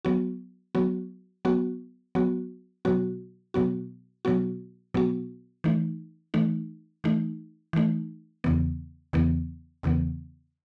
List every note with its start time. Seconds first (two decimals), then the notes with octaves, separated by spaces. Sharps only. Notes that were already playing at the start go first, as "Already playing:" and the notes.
0.05 F#3 B3 F#4
0.75 F#3 B3 F#4
1.45 F#3 B3 F#4
2.15 F#3 B3 F#4
2.85 B2 F#3 B3 F#4
3.54 B2 F#3 B3 F#4
4.25 B2 F#3 B3 F#4
4.94 B2 F#3 B3 F#4
5.64 E3 A3 D#4
6.34 E3 A3 D#4
7.04 E3 A3 D#4
7.73 E3 A3 D#4
8.44 E2 C#3 E3 B3
9.13 E2 C#3 E3 B3
9.83 E2 C#3 E3 B3